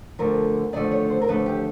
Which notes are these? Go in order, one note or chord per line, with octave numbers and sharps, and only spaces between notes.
D2 D3 F3 A3 A#4
D#2 D3 F3 A3 D5
C#5
C5
A#4
D#2 D3 F3 A3 B4
G4